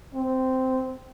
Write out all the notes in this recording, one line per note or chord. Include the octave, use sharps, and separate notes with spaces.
C4